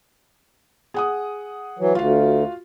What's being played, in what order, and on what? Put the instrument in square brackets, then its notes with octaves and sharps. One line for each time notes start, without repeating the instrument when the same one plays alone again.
[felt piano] G#4 F#5 D#6
[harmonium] E3 F#3
[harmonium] D2 [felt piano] F4 F#4 F5